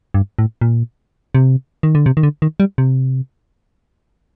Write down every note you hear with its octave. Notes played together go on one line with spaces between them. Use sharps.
G2
A2
A#2
C3
D#3
D3
C3
D#3
D3
D#3
G3
C3